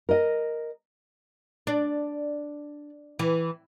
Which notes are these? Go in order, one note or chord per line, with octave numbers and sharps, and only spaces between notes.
A#4 D#5
D4
E3